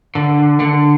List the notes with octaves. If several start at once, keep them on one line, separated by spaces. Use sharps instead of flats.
D3
D3